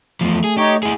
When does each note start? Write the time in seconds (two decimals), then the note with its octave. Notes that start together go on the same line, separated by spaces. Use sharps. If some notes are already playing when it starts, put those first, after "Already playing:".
0.21 E2 F3 A3
0.44 G#4
0.58 D#4 G4 C#5
0.83 G#3 E4 G#4